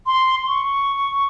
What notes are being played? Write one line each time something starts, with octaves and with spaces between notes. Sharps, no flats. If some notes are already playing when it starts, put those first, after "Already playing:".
C6
C#6